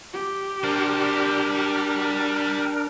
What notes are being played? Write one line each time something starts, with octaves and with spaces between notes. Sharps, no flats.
G4
G3 D4 A#4 C5